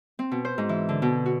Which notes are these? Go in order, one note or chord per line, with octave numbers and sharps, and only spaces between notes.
C4
B2
C5
G#2
E3
D3
B2
F#4